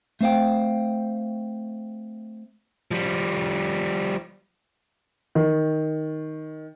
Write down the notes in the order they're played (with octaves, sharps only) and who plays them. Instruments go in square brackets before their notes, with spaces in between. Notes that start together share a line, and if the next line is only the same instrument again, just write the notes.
[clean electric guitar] A3 C4 C5 F5 G5
[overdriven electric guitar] F3 G3
[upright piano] D#3